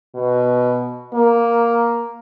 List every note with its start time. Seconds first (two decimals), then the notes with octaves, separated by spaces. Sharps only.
0.15 B2
1.14 A#3